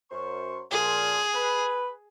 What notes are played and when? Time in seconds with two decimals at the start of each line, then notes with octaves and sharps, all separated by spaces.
0.11 F#2 C5 C#6
0.71 A#2 F3 G#4
1.34 B4